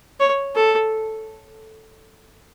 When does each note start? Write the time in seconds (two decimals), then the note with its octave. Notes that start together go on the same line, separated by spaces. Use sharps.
0.20 C#5
0.55 A4